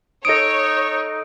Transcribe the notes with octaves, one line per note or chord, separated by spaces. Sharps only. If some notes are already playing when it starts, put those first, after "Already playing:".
D#4 A4 C#5 D#5 D#6 D7